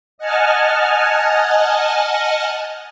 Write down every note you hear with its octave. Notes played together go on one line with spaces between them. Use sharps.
D#5 F#5 G#5 A5 F6